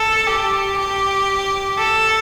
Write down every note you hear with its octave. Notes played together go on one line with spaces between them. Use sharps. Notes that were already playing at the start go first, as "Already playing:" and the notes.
Already playing: A4
G4
G4
A4